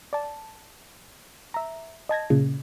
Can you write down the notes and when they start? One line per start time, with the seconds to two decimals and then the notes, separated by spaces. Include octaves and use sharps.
0.13 D5 A5
1.54 E5 A#5
2.09 D#5 A5 G#6 A#6
2.30 A#2 C#3